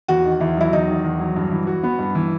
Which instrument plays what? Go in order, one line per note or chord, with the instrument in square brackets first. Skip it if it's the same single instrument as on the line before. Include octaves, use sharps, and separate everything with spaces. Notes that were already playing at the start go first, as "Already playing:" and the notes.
[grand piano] E2 [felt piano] F#4
[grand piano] D#3
[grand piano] E2 [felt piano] E4
[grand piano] F#3 [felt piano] E4
[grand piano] E2 [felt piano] D#4
[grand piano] D#3
E2
F#3
G2
E3
F#4
B3
G2
E3